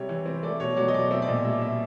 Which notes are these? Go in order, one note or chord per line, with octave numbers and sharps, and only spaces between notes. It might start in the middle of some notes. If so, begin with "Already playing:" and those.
Already playing: C3 G3 C#5
E3
C4
A3 D5
B2 C#5
F#3 D5
D#5
B2 D5
C4 E5
D5
A#2 D#5
G3 E5
A#2 E5